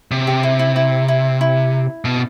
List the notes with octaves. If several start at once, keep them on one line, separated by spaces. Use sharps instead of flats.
C3
G4
E4
E4
E4
E4
E4
B2